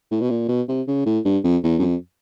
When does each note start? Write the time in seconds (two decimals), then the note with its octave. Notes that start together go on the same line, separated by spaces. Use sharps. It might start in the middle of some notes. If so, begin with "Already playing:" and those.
0.11 A2
0.21 B2
0.30 A#2
0.49 B2
0.68 C3
0.88 C#3
1.06 A2
1.25 G2
1.44 F2
1.64 E2
1.79 F#2
1.82 F2